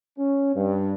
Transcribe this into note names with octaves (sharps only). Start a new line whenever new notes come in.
C#4
G2